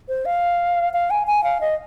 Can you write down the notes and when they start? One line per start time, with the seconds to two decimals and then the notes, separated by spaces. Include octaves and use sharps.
0.09 C5
0.25 F5
0.93 F5
1.10 G#5
1.27 G#5
1.44 F5
1.61 D#5